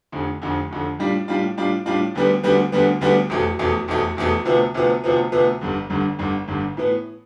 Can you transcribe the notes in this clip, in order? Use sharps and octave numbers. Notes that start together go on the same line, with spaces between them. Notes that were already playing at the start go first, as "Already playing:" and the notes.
F1 F2 D3
F1 F2 D3
F1 F2 D3
A2 G3 D4 F4
A2 G3 D4 F4
A2 G3 D4 F4
A2 G3 D4 F4
D2 D3 G3 B3
D2 D3 G3 B3
D2 D3 G3 B3
D2 D3 G3 B3
F1 E2 B2 A3
F1 E2 B2 A3
F1 E2 B2 A3
F1 E2 B2 A3
D2 C3 F3 B3
D2 C3 F3 B3
D2 C3 F3 B3
D2 C3 F3 B3
G1 G2 D3
G1 G2 D3
G1 G2 D3
G1 G2 D3
A2 E3 B3